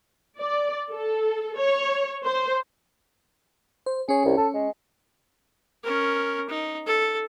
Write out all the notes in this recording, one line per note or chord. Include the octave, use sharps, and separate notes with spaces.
D5
A4
C#5
C5
C5
C#4 G#4 C#5
C2
A4
G#3
C#4 A#4
D#4
A4